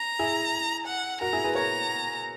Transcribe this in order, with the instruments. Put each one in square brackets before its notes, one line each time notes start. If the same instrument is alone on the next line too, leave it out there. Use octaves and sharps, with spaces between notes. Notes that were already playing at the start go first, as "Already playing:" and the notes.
Already playing: [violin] A#5
[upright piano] E4 G#4
[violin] F#5
[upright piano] F#4 A#4 [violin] A#5
[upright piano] E4 G#4
G#4 B4
[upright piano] A#4 C#5 [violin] A#5